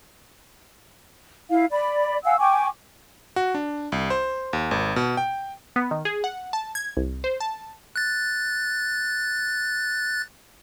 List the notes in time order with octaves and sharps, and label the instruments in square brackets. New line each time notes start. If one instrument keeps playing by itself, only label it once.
[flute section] E4 F5
D5 B5
F5 F#5 G#5 E6
G5 G#5 C#6 D6
[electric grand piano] F#4
D4
C2
C5
D#2
G#1
B2
G5
[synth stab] B3
D#3
G#4
F#5
A5
G#6
C2
C5
A5
[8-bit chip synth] F#6 A6